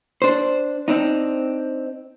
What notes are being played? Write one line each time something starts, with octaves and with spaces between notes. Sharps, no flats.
D4 C5
C4 D4 D#4